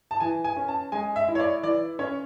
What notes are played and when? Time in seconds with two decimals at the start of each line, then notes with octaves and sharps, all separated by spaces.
0.11 A5
0.20 E3 G#5
0.44 G#5
0.57 C#4
0.68 A5
0.92 G#3 G#5
1.16 E5
1.28 E4
1.35 C#5
1.40 D5
1.63 E3 D5
1.99 C#4 C#5